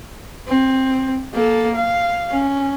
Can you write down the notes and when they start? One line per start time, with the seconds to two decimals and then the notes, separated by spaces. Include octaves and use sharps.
0.48 C4
1.34 A#3 A4
1.75 F5
2.31 C#4